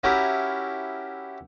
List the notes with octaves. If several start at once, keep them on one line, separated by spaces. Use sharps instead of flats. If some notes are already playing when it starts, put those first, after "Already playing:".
C#4 E4 F#4 G4 A#4